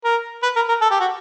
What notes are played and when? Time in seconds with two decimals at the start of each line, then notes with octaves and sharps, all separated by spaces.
0.04 A#4
0.43 B4
0.56 A#4
0.69 A#4
0.82 A4
0.91 G4
1.01 F#4